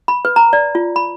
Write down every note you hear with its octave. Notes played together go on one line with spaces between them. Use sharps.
B5
B4
A#5
D5
F4
B5